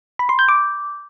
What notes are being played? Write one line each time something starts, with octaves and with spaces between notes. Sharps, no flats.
B5
C6
G6
D6